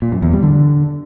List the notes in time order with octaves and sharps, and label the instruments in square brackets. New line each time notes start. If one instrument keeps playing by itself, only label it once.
[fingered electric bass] A#2
F#2
E2
G3
D3